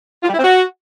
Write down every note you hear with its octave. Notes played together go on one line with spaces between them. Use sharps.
F4
G3
E4
C4
F#4